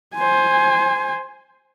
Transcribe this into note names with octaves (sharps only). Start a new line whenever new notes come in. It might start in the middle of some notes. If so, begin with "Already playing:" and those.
C5 G#5